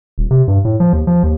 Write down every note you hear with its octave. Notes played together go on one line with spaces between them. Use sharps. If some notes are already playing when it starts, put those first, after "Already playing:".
D#1
C3
G2
A2
F3
D#2
F3
D#2